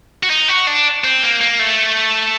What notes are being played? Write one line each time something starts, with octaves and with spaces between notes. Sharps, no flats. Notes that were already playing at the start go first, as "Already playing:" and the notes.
F#4
D#4
F#4
D4
C4
A#3
A#3
A3